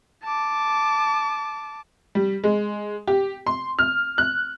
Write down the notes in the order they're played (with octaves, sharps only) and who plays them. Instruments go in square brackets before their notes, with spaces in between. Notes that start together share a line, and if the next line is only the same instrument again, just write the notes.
[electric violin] A5 D6
[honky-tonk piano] G3
G#3
G4
C6
F6
F#6